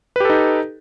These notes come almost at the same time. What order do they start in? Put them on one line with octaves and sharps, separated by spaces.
B4 G4 A4 D#4